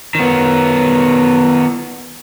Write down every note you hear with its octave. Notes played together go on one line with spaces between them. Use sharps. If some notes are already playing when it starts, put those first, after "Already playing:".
D#3 B3